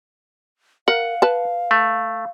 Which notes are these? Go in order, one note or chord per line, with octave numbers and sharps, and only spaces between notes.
A#4 F5 F#5
B4 A5
A3